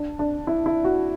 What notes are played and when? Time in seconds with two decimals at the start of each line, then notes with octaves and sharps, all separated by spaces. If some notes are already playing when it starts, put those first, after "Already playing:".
Already playing: D4
0.19 D4
0.47 E4
0.66 E4
0.84 F#4